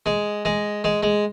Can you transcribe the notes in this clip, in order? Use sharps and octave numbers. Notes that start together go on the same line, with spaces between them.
G#3
G#3
G#3
G#3